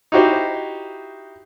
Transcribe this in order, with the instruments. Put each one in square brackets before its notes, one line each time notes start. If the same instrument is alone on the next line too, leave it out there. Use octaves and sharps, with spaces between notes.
[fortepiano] D#4 E4 F#4 G4 C5